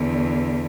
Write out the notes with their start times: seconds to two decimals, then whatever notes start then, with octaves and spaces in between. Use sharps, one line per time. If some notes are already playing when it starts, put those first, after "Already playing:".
Already playing: E2 D3